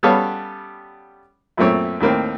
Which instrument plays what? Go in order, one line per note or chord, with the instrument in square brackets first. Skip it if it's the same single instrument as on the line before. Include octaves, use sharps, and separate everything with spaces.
[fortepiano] G3 B3 C#4 A4 C#5 F5
F#2 A#2 A3 C4 C#5
D#2 A2 A#3 C4